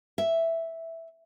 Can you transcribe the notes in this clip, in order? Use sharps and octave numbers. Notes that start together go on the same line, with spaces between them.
E5